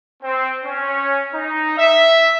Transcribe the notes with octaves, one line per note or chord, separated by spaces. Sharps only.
C4
C#4
D#4
E5